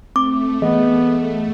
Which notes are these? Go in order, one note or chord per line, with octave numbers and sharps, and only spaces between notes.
A3 C4 D6
E3 B3 G#4 D#5